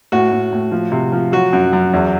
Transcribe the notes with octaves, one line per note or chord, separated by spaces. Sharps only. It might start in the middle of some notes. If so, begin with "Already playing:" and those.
A2 F#4
A2
A2
F3
C3
F3
F#3 F#4
F#2
F#2
E2